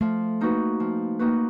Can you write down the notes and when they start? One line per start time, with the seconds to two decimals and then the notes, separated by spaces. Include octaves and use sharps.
0.01 F3 A3
0.41 A#3 D#4 F#4 B4
0.80 F3
1.19 A#3 D#4 F#4 B4